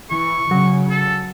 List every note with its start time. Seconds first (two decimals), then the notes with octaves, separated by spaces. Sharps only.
0.10 E3 C#6
0.51 C#3 F#3
0.90 A4